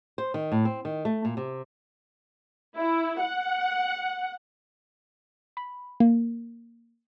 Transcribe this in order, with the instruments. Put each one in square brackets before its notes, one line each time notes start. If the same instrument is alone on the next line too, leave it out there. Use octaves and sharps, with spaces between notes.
[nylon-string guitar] C5
D#3
A2
C4
D#3
A3
A#2
C3
[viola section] E4
F#5
[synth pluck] B5
A#3